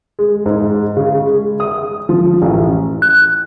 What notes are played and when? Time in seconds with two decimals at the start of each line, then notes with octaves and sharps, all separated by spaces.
0.19 G#3
0.46 G#2
0.97 C#3
1.26 G#3
1.60 D#6
2.09 F3
2.42 A1
3.02 F#6